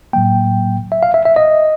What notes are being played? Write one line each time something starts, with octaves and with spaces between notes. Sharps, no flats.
A2 F#3 A#3 G5
E5
F5
E5
E5
D#5